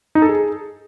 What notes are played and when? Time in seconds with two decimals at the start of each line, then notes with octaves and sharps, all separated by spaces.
0.15 D#4
0.22 A4
0.29 G#4